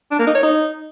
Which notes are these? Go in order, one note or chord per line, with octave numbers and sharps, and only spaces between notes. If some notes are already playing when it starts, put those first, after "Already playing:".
D4
A#3
D#4
C#5
D#4